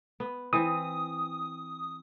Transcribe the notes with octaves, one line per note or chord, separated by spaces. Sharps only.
B3
E3 C4 D#6